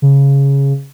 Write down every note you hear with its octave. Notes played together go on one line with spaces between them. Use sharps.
C#3